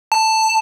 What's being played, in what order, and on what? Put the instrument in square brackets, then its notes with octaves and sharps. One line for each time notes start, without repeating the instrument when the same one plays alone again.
[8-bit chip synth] A5